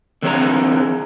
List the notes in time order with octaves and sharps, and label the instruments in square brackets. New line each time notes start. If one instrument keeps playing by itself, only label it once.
[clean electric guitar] D3 E3 C4 G#4 B4 A#5